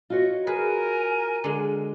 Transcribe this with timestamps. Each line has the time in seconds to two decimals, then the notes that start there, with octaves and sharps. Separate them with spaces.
0.10 F4 F#4 C#5 D#5
0.47 G#4 A#4 B4 G#5
1.44 D3 G#3